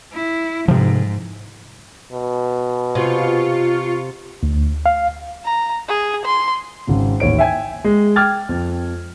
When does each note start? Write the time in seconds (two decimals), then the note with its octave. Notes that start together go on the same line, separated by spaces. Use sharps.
0.13 E4
0.68 G#2 C3 F3
2.12 B2
2.95 C3 F4 C#6
4.43 D2
4.86 F5
5.45 A#5
5.88 G#4
6.25 C6
6.87 G#1 C#3
7.20 A1 D#2 C#5 D7
7.39 E5 G5 G#5 G#6
7.84 G#3
8.16 G5 D6 F6 G#6 A6
8.49 F2